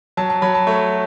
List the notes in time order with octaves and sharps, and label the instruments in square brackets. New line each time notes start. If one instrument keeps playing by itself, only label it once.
[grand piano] F#3 A5
A5
F#3 B5
A5
A3 C#5